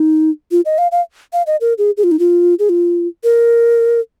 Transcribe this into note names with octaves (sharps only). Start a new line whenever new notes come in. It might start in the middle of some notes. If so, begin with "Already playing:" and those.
Already playing: D#4
F4
D#5
F5
F5
F5
D#5
A#4
G#4
G#4
F4
D#4
F4
G#4
F4
A#4